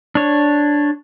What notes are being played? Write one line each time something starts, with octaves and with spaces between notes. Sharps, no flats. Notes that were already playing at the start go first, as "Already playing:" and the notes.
D4 C#5